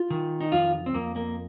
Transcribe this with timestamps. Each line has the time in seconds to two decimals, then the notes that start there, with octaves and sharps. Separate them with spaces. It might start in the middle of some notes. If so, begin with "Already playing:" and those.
Already playing: F4
0.10 D#3
0.41 D#4
0.52 F2 F4
0.86 C4
0.94 F2 A#3
1.16 A#3